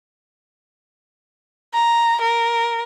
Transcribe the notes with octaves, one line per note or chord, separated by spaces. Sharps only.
A#5
A#4